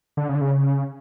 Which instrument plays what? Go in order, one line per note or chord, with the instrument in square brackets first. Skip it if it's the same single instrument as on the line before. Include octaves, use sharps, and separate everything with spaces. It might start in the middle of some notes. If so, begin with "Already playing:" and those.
[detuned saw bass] D3
C#3
D3
C#3